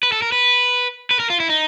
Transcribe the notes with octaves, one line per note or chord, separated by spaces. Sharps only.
B4
A4
A#4
B4
B4
A#4
F4
E4
D#4